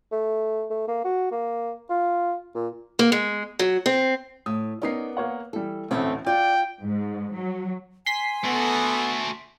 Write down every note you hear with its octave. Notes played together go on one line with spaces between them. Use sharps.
A3
A3
A#3
F#4
A#3
F4
A#2
A#3
G#3
F#3
C4
A2 D#6
B3 C#4 D#4 A#4 D5 C7
A#3 C#5 F#5
E3 G3 A4
A1 D2 A3 C4 C#4
F4 D5 G5
G#2
F#3
G#5 C6 B6
A3 B3 F#4 A4